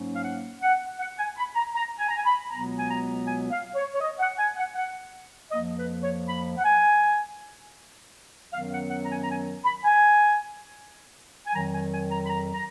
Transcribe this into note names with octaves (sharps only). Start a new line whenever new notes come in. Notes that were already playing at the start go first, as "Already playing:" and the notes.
Already playing: G#2 F#3 A#3 C#4
F5
F#5
F#5
F#5
G#5
B5
A#5
A#5
G#5
A#5
G#5
B5
C#2 B2 F#3 B3 A#5
G#5
A#5
G#5
F5
C#5
C#5
D#5
F#5
G#5
F#5
F#5
F2 F3 A#3 D#5
B4
C#5
B5
F#5
G#5
F#2 D#3 F#3 B3 F5
F#5
F#5
A#5
G#5
A#5
G#5
B5
G#5
G#5
F2 D#3 F#3 A#5
G#5
G#5
A#5
B5
A#5
A#5